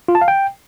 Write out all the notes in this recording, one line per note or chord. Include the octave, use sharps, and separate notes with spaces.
F4
A5
F5
G5